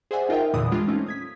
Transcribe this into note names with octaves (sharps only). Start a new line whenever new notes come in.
G#4 C5 D5 E5 F#5 G#5
D#4 F4 A#4 D#5 E5 G5
E2 A#2 D3 E3 D#6
G3 G#3 D4 F4
A3 C4 C#4 D#4 F4
D#6 G#6 B6